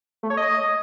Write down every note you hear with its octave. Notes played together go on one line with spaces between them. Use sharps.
A3
C#5
D#5